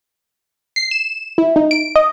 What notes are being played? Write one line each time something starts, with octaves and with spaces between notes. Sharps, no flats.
C7
E7
E4
D#4
D7
D#5